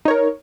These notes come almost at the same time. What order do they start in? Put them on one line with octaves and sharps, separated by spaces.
D#4 C#5 A#4